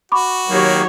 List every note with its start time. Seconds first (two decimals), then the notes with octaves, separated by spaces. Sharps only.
0.12 F#4 B5 C#6 D6
0.49 D#3 F#3 A#3 G4 C#5